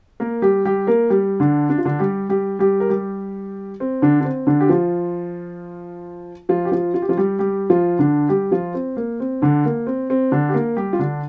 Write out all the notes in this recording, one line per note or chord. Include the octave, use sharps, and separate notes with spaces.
A#3 A#4
G3 G4
G3 G4
A#3 A#4
G3 G4
D3 D4
D4
F4
D3 D4
G3 G4
G3 G4
G3 G4
A#4
G3 G4
C4
D3 D4
D4
C4
D3 D4
G4
F3 F4
F3 F4
G4
F3 F4
F4
G4
F3 F4
G3 G4
G3 G4
F3 F4
D3 D4
G3 G4
F3 F4
C4
A#3
C4
D3 D4
A#3
C4
C4
D3 D4
G4
A#3 A#4
G3 G4
F4
D3 D4